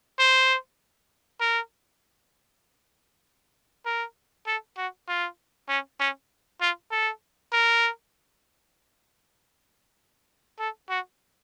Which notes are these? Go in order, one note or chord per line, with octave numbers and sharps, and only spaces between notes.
C5
A#4
A#4
A4
F#4
F4
C#4
C#4
F4
A4
A#4
A4
F#4